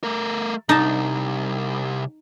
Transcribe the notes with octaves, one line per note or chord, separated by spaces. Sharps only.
A3 A#4
C2 D#4 A5